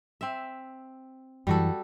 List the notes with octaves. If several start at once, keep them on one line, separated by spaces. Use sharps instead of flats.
C4 E5
F#2 E3 G3 F#4 A4